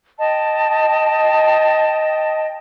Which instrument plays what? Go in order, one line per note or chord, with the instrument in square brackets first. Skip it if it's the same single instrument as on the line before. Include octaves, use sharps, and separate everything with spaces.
[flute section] D#5 G5 A5